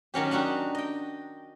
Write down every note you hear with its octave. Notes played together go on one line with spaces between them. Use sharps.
D#3 F#3 C#4 G4
D4 D#4 F#4 G4
D#5 G5